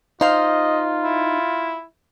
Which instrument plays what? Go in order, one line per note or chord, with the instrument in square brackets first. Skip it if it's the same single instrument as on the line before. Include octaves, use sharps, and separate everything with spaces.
[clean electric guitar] D#4 [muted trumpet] F4 [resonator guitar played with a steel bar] C5 F5 [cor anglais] D#5
[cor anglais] E4